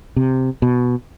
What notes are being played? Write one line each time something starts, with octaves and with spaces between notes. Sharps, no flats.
C3
B2